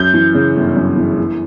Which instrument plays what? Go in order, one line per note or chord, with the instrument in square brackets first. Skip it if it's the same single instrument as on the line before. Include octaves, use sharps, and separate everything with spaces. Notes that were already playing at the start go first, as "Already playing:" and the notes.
Already playing: [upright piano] F#2 [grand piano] G6
[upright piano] E3
C#3
G1
F#2
E3
E3